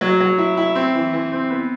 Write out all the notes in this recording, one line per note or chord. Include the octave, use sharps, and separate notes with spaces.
F#3
F#3
E4
E4
C4
E3
E3
C4
B3